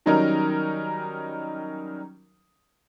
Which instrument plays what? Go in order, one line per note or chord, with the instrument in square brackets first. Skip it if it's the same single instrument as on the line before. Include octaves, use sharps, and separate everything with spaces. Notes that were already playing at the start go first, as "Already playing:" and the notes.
[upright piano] D#3 F#3 G3 C#4 D#4 A#4